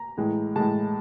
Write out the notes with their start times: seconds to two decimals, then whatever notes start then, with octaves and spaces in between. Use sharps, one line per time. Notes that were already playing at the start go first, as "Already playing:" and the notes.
Already playing: A#5
0.17 A2 E3 G#3
0.56 A2 E3 G#3 A5